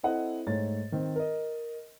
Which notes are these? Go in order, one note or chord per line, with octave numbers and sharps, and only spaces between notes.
C4 E4 A4 D#5 F#5
G#2 A3 C#5 A6
D#3 C4
A#4 D#5